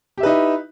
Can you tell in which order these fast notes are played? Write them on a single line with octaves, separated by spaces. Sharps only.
G4 E5 B4 D#4 E4